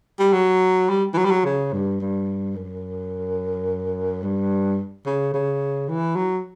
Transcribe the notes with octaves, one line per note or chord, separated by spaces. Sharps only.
G3
F#3
G3
E3
F#3
G3
F#3
C#3
G2
G2
F#2
G2
C#3
C#3
E3
F#3